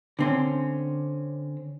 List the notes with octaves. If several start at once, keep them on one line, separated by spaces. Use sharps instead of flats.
D3 C4 C#4